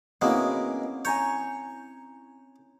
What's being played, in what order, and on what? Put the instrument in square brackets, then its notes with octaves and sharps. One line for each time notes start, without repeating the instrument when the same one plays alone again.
[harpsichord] B2 G#3 A#3 [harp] C4 C#4 E4
[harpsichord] C#5 [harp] G#5 A#5 G6